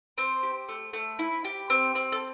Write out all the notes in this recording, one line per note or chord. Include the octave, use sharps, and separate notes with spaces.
C4 C5
G4
A3
A3
E4
G4
C4
C4
A4